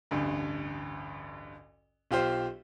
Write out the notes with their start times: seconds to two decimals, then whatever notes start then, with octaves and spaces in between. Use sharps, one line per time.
0.11 A1 D2 G2
2.11 B1 F4 G4 C5